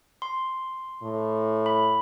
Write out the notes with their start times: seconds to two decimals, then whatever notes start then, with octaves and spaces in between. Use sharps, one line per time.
0.22 C6
1.03 A2
1.66 B5